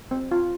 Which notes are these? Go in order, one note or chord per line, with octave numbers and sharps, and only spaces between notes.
C4
F4